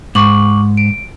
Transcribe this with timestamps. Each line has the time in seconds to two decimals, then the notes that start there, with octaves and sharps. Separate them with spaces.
0.15 G#2 C#6 D6 F#7
0.77 D7